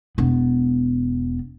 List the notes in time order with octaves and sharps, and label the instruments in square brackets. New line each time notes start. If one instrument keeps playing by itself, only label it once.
[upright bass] E1 B3